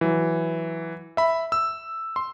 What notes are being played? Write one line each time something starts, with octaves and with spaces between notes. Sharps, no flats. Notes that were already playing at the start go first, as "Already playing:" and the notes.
E3 F#3
E5 B5
E6
C6